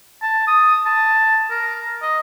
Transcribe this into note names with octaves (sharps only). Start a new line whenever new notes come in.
A5
D#6
A5
A#4
D#5